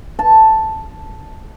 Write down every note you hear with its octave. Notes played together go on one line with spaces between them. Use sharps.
A5